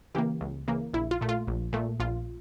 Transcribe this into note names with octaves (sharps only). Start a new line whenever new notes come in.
C#3 E3 A#3 G4
C#2
C#3 E3 A#3
A#1 E4
F4
A#2 A3
F4
A#1
A#2 A3
A#1 F4